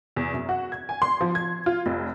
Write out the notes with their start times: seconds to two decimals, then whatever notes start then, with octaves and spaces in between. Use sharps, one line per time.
0.16 E2
0.34 F#2
0.49 F#4
0.72 G#6
0.89 G#5
1.02 C6
1.21 F3
1.35 G#6
1.66 F4
1.86 F1